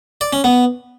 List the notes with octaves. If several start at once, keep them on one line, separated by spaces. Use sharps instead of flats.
D5
C#4
B3